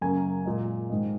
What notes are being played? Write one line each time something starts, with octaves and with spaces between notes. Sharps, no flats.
F#2 C#3 F#3 A#3 G#5
A#2 G#3
G#2 D#3 G#3